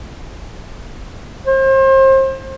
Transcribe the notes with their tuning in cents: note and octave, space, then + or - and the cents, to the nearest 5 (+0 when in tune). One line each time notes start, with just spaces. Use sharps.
C5 +35